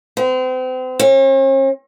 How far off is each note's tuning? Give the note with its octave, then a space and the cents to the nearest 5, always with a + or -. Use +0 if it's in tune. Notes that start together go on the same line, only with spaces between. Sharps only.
C4 -35
C#4 -45